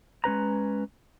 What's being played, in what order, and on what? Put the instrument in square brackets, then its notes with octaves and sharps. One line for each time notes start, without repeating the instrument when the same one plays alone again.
[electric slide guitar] G#3 C#4 B4 A#5